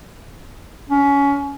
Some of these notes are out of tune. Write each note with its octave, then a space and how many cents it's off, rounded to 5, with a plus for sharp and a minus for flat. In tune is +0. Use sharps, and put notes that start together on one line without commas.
C#4 +25